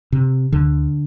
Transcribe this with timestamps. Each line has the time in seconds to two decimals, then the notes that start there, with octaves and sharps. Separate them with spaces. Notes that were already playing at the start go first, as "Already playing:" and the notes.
0.12 C3
0.52 D2 D3